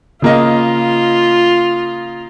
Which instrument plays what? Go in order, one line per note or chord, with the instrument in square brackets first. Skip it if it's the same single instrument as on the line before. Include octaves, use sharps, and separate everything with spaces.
[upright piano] C#3 A#3 D#5 [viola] F4